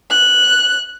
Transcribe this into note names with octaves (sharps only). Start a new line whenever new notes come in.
F#6